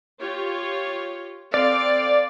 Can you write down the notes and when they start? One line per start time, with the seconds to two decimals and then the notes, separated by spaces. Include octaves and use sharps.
0.20 F4 G4 C#5
1.54 C4 A4 D5 F5